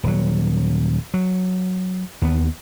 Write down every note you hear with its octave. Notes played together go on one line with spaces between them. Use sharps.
D#1 F#3
F#3
D#2 B3